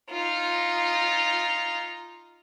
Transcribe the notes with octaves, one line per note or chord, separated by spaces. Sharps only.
D#4 F4